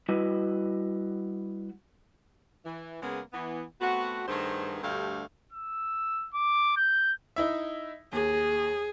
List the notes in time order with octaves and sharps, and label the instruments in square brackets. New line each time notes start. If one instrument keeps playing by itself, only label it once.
[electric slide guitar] G3 E4 F#4 B4 D#5
[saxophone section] E3
C#3 G#3 A#3 B3
E3 B3
A3 B3 C4 F#4
G2 D#3 A3 B3 G#4 C5
D2 G2 G3 A3 G4 F5
[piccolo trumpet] E6
D6
G6
[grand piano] D#4 E4 E5
[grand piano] D#2 [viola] G#4